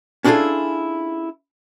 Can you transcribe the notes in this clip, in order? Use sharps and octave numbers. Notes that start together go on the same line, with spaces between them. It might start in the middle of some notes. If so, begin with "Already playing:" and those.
C#4 D4 E4 F4 G#4 A4